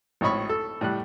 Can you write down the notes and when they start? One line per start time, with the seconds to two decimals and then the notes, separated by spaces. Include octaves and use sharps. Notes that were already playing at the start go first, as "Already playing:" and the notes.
0.21 G#1 A2 C#5 D#5 B5 C#6
0.49 A4
0.81 A2 G3 F#6